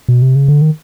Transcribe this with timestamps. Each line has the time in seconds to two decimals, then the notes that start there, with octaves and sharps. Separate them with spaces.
0.09 B2
0.22 C3
0.35 C#3
0.48 D3
0.61 D#3